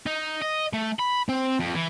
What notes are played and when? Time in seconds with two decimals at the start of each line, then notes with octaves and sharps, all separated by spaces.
0.07 D#4
0.42 D#5
0.73 A3
0.99 B5
1.29 C4
1.59 F2
1.75 E3